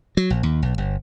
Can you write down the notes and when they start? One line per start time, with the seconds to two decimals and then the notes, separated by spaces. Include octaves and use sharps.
0.17 F#3
0.30 A#1
0.43 D#2
0.62 B1
0.78 G1